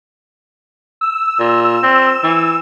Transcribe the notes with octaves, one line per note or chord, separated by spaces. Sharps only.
E6
A#2
C4
E3